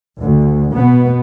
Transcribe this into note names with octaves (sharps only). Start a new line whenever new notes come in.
D2
B2 B3